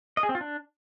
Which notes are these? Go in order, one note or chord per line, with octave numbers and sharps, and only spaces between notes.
D#5
G#4
C4
F4
D4